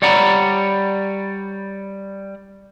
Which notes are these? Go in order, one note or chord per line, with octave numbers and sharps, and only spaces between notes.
G3 C#5 D5 F#5 A#5 B5